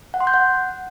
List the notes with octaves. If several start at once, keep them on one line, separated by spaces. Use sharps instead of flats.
F#5
C6
G6
F#5